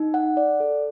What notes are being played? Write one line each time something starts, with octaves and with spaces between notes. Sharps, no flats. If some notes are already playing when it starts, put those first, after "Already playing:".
Already playing: D#4
F#5
D5
A4